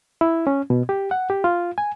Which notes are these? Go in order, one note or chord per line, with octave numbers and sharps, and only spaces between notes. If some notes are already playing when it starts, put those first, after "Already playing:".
E4
C#4
B2
G4
F#5
G4
F4
G#5